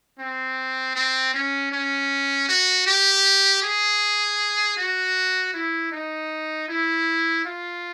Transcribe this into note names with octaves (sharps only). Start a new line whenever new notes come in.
C4
C4
C#4
C#4
F#4
G4
G#4
F#4
E4
D#4
E4
F4